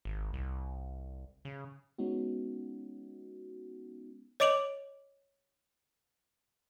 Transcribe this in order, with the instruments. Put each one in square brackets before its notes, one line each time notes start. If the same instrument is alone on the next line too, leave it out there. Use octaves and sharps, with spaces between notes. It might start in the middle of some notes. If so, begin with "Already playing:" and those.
[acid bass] G#1
C2
C#3
[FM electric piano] G#3 B3 C#4 D#4 F#4
[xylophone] C#5 D#5 D6 D7 F7 F#7